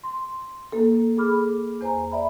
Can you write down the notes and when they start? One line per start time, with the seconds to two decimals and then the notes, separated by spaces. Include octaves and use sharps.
0.04 C6
0.72 A#3 A4
1.17 G#4 A4 B5 D6 F6
1.81 E2 C5 G#5 A#5
2.12 D5 E5 B5